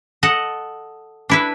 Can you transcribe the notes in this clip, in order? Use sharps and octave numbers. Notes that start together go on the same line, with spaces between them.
A4 D#5 F#5
D4 E4 B4